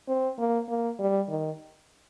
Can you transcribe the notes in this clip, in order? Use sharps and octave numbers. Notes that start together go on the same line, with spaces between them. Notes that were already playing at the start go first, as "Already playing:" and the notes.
C4
A#3
A#3
G3
D#3